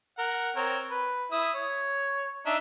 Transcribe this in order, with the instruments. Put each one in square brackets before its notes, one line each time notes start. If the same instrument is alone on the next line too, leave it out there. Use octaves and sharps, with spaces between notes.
[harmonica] A#4 F#5
C4 A#4 C#5
B4
E4 D#6
C#5
D4 D#4 E5